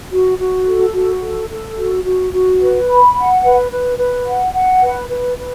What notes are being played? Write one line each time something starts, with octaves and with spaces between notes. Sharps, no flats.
F#4
F#4
A4
F#4
A4
A4
F#4
F#4
F#4
B4
B5
F#5
B4
B4
B4
F#5
F#5
B4
B4
B4